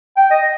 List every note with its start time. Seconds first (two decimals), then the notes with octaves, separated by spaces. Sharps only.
0.17 G5
0.30 D#5